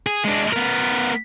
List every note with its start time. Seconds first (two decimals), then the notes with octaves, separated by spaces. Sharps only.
0.06 G#4
0.24 G#3 D4
0.53 B3 A#4